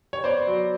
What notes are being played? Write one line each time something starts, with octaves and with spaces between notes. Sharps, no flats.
C#5
B3 C5 D5
F#3